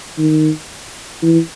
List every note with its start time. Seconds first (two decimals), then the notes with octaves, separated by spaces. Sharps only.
0.18 D#3
1.22 E3